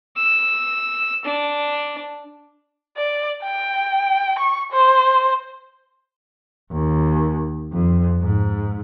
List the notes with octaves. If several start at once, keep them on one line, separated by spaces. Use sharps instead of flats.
E6
D4
D5
G5
C#6
C5
D#2
F2
G#2